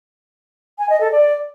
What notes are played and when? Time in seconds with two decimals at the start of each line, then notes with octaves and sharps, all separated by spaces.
0.79 G#5
0.90 D#5
1.01 A4
1.12 D5